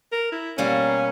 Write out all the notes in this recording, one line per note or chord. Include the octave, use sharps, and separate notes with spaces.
A#4
E4
B2 G3 A#3 C#4